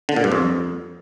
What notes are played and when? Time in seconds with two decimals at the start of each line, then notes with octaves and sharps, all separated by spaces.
0.09 D3
0.16 A#2
0.24 G2
0.32 F2